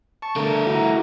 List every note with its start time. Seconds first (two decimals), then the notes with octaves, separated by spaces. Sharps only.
0.22 A5 C#6
0.36 D3 A3 A#4
0.67 E4 F#4 A#5